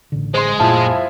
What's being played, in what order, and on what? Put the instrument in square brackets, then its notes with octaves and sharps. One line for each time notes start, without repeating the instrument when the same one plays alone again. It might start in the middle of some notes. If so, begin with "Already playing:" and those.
[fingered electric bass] A1 D3
[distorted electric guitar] G#3 [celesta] C5 C6
[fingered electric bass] F#1 A#2 A#3 [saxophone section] F3 E4 [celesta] A5